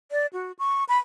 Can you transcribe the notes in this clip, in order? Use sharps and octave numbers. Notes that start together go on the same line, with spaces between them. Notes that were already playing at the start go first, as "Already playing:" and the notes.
D5
F#4
C#6
B5